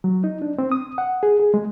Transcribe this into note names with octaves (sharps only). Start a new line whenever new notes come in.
F#3
D#4
D4
C4
D#6
F#5
G#4
G#4
G#3